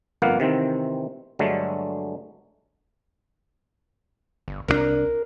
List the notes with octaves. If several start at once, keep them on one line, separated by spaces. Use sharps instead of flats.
G1 F2 A#3 B3 F5 F#5
C3 D#3 E3 C4
G2 D3 F#3 G#3 A3
G1
C2 E3 D4 A#4